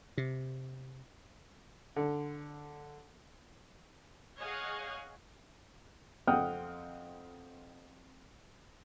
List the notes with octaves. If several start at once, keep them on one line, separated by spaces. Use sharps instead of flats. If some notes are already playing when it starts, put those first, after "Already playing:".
C3
D3
G#4 C#5 D#5 F5 F#5 G#5
F2 C4 F#5 G5 D#6 F6